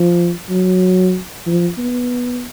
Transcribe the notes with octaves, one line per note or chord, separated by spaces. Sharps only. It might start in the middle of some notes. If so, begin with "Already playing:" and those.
Already playing: F3
F#3
F3
B3